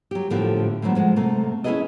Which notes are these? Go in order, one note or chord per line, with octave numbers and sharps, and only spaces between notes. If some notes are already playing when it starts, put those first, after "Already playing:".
F#3 G4
A2 D3 F3 A3 A#3 G4
A2 D3 F3 F#3 B3
F3 G#3 F#5
C3 A3 A#3
C#4 E4 F4 G#4 B4 D#5